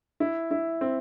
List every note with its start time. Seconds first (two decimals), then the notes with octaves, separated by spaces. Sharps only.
0.20 E4
0.51 E4
0.81 C4